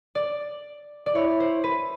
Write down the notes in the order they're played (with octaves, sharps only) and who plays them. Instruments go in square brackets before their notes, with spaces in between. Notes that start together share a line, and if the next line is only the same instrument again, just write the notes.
[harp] D5
D5
[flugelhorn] E4 [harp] C#5
[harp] C5
B4